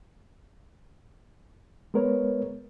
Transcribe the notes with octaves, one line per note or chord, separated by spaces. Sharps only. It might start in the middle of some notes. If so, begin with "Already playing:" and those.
G#3 B3 A#4 B4 C#5